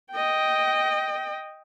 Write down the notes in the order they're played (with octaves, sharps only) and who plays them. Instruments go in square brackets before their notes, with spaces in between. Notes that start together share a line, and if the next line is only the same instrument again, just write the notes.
[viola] D#5 G5